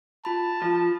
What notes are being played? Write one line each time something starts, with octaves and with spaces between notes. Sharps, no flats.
F4 A5 B5
F3